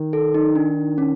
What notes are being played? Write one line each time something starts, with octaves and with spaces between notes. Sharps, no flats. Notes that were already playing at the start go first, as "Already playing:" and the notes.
Already playing: D#3
A4
D#4
D4
C#4